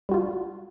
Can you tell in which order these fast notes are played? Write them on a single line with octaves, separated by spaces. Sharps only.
G3 F#4 F4